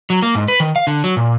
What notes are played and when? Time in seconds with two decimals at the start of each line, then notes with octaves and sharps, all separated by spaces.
0.10 F#3
0.22 A#3
0.35 G#2
0.48 B4
0.60 D#3
0.76 F5
0.87 D3
1.04 F#3
1.17 A#2